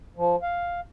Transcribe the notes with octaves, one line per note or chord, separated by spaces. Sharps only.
F3
F5